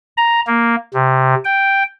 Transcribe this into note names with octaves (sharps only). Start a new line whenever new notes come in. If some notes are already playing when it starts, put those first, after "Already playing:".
A#5
A#3
C3
G5